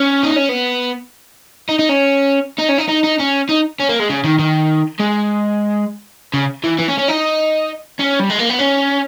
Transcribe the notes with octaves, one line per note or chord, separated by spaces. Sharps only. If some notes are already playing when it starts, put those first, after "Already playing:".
Already playing: C#4
D#4
C#4
B3
D#4
D#4
C#4
D#4
C#4
D#4
D#4
D#4
C#4
D#4
C#4
A#3
G#3
C#3
D#3
D#3
G#3
C#3
E3
E3
C#4
C#4
D#4
C#4
G3
G#3
A#3
B3
C#4